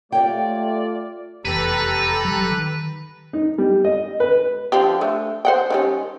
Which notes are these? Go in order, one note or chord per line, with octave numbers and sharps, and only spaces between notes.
A3 F4 G4 C#5 D5 G5
F1 E2 G4 A4 B4 A#5
F#3 G3
D#3
D#4
G3
D#5
B4
D3 F3 G4
A3 D4
C5 F#5 G5
D#3 G3 C#4